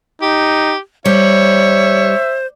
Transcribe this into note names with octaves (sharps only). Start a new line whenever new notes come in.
D#4 G4
G3 C5 C#5 E5